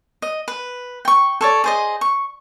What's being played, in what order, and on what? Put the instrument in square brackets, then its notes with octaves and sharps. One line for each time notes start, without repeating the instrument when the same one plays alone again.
[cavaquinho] D#5
B4
G5 C#6
A4 C#5 D5
G#4 C5 D#5
C#6